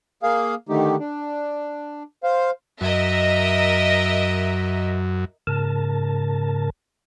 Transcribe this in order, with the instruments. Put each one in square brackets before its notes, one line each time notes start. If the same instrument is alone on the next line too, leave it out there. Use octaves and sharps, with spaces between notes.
[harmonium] A#3 G#4 F5
D3 D#3 A3 D#4 G4
D4
C5 F5
[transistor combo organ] F#2 [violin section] A#4 D#5 E5
[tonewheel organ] G#2 C#3 A#4 A5